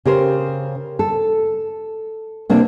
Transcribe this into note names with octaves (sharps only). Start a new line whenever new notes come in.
C#3 G4 A#4 C5
A4
C3 A#3 C4 D4